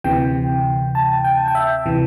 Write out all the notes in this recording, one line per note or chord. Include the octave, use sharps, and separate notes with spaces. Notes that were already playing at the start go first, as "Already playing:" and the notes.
D2 C3 E3 G5
A5
G5
G5
E5
C3 E3